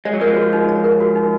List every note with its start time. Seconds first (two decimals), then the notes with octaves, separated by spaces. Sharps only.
0.05 G#3 C#5
0.13 F#3
0.20 F3 G#3 A#4
0.36 F#4
0.53 D#4
0.69 C#5
0.84 A#4
1.00 F#4
1.16 D#4